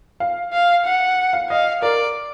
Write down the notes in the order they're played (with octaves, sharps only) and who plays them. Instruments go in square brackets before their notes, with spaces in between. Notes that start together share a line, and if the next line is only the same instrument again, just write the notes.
[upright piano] F5
[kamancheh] F5
F#5
[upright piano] F5
[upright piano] D#5 [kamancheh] F5
[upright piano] A#4 [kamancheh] D5